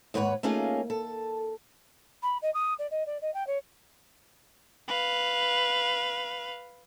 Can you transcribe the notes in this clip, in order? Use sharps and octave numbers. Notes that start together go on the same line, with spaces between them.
D#2 G#2 B4 C#5 F#5
A3 A#3 C#4 D#4 F4 G#4
A4
B5
D#5
D#6
D5
D#5
D5
D#5
G5
C#5
B4 F5